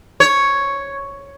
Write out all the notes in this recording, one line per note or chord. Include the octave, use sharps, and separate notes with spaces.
C#5